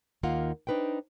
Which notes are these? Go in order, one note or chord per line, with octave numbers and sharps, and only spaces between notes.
D#2 D#3 A#3 F4 F#5
D4 D#4 B4 C5 G5